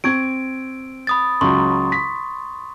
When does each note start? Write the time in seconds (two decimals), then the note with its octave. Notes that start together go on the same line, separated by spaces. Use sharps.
0.04 C4 C#6 G#6 D7
1.07 B5 D#6 A6
1.41 C#2 F#3 C6 C#6
1.92 B6